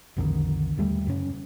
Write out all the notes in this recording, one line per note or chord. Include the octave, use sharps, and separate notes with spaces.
B1 F2 D3 D#3
D#1 D#2 G3 A3
F#2 C#3 C#4